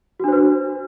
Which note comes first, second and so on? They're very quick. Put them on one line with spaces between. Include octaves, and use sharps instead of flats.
F#4 D4 C5 B4